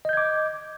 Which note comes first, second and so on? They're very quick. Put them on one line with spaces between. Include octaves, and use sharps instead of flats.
D#5 G6 G#6 D6